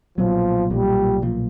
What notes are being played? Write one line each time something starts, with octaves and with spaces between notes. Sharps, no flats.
B1 A#2 F3 F#3 B3
B1 A#2 F3 G3
B1 A#2 F3